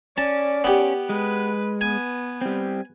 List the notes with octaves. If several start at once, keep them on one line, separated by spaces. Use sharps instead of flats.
C#4 D5 A5
B3 G4
G#3 B4
B3 G#5
G3 C4